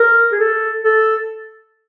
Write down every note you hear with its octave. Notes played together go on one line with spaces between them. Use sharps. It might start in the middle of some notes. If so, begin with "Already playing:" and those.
Already playing: A#4
G#4
A4
A4